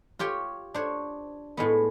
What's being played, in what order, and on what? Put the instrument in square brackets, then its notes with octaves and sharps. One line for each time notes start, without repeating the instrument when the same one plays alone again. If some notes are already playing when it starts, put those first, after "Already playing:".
[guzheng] F4 G4 C#5 G5
D4 C5 C#5
A2 G#3 B3